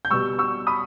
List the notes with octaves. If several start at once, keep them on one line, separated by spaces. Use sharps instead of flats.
G6
B2 G3 B3 C#6 E6
C#6 E6
B5 D#6